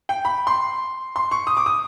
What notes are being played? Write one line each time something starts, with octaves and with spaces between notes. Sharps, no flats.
G5
B5
C6
C6
C#6
D#6
D6
D#6